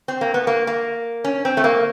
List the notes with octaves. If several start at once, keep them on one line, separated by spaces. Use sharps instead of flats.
C4
A#3
B3
A#3
A#3
C#4
C4
A3
A#3